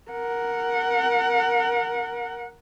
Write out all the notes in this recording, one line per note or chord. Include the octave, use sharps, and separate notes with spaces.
A#4 F#5